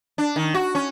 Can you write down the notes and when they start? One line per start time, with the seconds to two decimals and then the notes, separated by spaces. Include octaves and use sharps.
0.18 D4
0.36 D#3
0.54 F#4
0.75 C#4